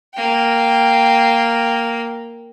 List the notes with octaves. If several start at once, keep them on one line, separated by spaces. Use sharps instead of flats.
A#3 G5